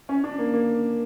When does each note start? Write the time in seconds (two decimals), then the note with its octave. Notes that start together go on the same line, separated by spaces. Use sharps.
0.09 C#4
0.24 D4
0.39 A#3
0.54 A#3